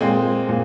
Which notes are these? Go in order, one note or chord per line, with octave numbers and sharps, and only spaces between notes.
A#2 G#3 C4 C5
A#2